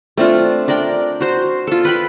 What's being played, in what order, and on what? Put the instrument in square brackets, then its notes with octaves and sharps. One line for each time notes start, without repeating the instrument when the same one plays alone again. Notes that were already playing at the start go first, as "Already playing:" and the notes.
[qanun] A3 C4 D4 F4
D4 A#4 D5 G5
F#4 C5
F4 A4
B4 G5 B5